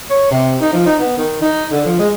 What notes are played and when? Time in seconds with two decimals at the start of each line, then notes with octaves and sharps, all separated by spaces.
0.10 C#5
0.31 C3
0.61 D#4
0.73 F3
0.86 D#4
0.99 B3
1.17 D#3
1.41 D#4
1.72 D3
1.85 F3
1.99 G#3